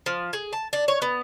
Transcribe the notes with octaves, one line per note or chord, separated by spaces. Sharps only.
F3
G#4
A5
D4
C#5
B3